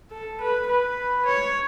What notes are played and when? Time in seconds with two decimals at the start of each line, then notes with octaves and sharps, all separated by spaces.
0.12 A4
0.41 B4
0.69 B4
1.26 C#5